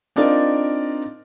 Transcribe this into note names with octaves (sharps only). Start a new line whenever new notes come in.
C4 D4 D#4 F4 A#4 D5